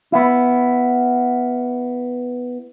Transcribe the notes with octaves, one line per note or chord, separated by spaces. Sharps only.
B3 E4